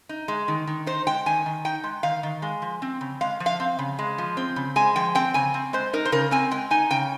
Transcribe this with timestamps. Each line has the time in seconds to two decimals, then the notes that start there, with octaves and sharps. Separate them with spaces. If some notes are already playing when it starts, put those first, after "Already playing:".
0.09 D#4
0.28 G#3
0.48 D#3
0.67 D#3
0.86 D#4 C5
1.07 G#3 G5
1.26 D#3 G#5
1.46 D#3
1.65 D#4 G5
1.84 G#3
2.03 D#3 F5
2.23 D#3
2.42 G#3
2.62 F3
2.82 C4
3.01 C#3
3.21 G#3 F5
3.40 F3
3.46 F5
3.60 C4
3.79 C#3
3.99 G#3
4.18 F3
4.37 C4
4.56 C#3
4.76 G#3 G#5
4.96 F3 G5
5.15 C4 G5
5.34 C#3 G#5
5.54 C4
5.73 G#3 C5
5.93 D#4 A#4
6.05 C5
6.12 C#3 A#4
6.31 C4 G#5
6.51 G#3 G5
6.71 D#4 G#5
6.90 C#3 G5